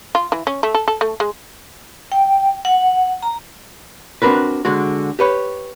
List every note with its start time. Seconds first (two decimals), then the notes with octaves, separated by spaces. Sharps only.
0.15 F4
0.32 E3
0.47 C#4
0.63 A3
0.74 A4
0.88 A4
1.01 A3
1.20 G#3
2.12 G5
2.65 F#5
3.22 A#5
4.22 C4 D4 F#4 A#4 B4
4.65 D3 G#3 F#4
5.19 G4 B4 C#5